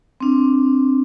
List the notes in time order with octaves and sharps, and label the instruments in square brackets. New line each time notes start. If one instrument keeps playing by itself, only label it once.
[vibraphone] C4 D4